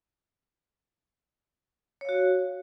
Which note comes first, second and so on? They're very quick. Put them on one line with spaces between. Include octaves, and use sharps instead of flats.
C#5 F5 F#4